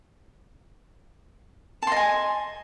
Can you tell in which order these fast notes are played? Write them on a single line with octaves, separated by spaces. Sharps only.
A5 C6 D#5 G#5